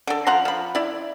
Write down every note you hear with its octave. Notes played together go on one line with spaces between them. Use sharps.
D3 A4
F3 F#5 A#5 C6
F3 B5
E4 D5